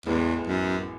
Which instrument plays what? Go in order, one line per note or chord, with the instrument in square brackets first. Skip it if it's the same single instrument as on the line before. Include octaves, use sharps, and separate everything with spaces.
[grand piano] A1 A2 G#3 B3 [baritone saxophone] E2
[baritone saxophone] F#2